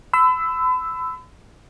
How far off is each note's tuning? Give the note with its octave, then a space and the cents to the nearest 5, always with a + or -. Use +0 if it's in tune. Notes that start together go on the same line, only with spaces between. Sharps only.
B5 +40 E6 +0